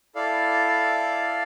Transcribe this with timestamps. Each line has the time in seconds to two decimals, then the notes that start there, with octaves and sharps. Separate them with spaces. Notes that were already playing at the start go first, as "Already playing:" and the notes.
0.15 E4 A4 D5 F5